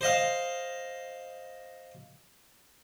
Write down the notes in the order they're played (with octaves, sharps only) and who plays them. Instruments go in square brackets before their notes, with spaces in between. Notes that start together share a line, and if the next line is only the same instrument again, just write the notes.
[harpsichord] C5 D#5 F5